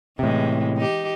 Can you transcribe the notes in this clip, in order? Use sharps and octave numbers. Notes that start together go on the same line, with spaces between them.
A2 C3 E3 G#3
D#4 G4